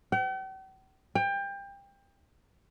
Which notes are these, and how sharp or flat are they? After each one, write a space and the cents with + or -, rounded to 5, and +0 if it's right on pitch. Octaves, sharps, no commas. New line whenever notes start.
G5 -45
G5 +25